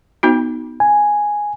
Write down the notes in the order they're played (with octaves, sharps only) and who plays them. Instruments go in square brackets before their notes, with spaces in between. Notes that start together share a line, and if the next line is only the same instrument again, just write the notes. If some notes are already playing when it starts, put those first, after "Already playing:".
[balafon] B3 D#4 F#4
[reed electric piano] G#5